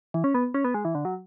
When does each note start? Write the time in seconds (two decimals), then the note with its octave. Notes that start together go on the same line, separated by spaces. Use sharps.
0.14 E3
0.24 C#4
0.34 B3
0.54 C#4
0.64 B3
0.74 G#3
0.85 E3
0.95 D3
1.05 F#3